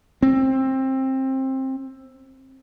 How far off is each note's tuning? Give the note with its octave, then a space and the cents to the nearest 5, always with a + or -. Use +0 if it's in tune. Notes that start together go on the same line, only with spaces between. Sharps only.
C4 +20